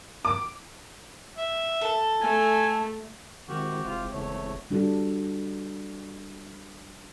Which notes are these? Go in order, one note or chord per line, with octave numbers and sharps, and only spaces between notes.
D6
E5
A4
A3 G#5
D#3 G#3 C4 E4 F#4 G4
F1 F4
F#1 E2 A3 C#5
G3 D4 F#4 G4 A4